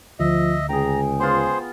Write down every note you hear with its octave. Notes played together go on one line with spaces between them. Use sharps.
D2 F3 D#5 E5
C#2 G#4 G5 A#5
B3 F4 G#4 C5 C6